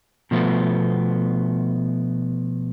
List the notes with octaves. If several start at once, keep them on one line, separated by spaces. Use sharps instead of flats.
B2 F3 A3 B3